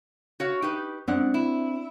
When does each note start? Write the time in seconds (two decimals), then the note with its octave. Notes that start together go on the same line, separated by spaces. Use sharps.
0.40 F#4 C#5 F5
0.62 D#4 G4 B4
1.08 F#2 G#3 C4 D4 F#5
1.34 E4